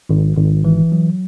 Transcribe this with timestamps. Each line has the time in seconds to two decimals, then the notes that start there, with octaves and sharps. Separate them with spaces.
0.09 G#1
0.37 G#1
0.64 E3
0.92 F#3